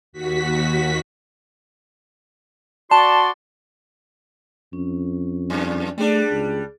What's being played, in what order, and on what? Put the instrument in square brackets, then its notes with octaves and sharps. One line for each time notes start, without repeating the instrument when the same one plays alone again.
[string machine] D#2 F#4 B6
[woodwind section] F#4 D5 C6 [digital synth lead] A5
[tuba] F2 [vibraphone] C#4
[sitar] F#2
[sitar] G3 D4 [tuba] A3 [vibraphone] G#4
[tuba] C#2